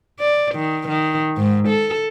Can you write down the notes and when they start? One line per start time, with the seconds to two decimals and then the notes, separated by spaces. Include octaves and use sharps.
0.20 D5
0.55 D#3
0.88 D#3
1.37 G#2
1.68 A4